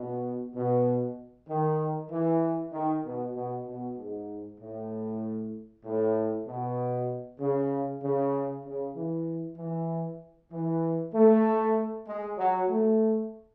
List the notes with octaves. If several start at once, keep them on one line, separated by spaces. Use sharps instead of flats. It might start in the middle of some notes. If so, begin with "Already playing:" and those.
Already playing: B2
B2
D#3
E3
D#3
B2
B2
B2
G#2
A2
A2
B2
C#3
C#3
C#3
E3
E3
E3
A3
G#3
F#3
A3